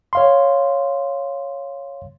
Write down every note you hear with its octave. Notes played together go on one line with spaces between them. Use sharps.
C#5 F5 C6